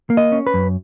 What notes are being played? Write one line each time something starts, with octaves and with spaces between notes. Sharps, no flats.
A#3
D#5
C#4
B4
F#2